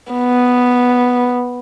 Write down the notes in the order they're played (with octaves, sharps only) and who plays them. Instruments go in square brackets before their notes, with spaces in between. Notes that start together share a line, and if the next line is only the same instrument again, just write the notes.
[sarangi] B3